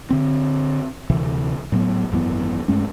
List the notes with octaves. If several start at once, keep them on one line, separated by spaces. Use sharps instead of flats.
D3 C4
D2 C3 E3
A2 F#3 B3
G#1 F#2 E3 B3
G2 G#3 A3 C#4